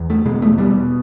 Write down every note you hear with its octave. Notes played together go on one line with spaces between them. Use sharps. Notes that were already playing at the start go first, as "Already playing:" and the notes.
Already playing: E2
A3
B2 G#3
A3
B2 G3